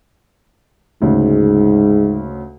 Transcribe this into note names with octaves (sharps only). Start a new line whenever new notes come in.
D2 G#2 C#3 G#3